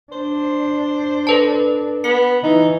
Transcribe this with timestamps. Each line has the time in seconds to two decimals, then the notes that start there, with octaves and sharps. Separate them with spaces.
0.12 D4 C5
1.27 A4 B4 A5
2.04 B3 C#7
2.43 E3 D#4